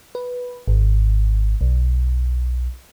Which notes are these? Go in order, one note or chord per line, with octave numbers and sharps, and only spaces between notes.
B4
G#1
B1